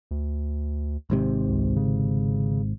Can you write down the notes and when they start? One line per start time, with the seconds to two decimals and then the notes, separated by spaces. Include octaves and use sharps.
0.11 D2
1.10 G#1 G#2 C3
1.48 C#2
1.76 C#3